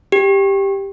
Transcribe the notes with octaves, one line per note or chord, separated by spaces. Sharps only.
G4